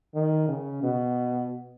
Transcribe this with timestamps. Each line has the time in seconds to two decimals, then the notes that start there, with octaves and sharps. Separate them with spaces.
0.14 D#3
0.48 C#3
0.83 B2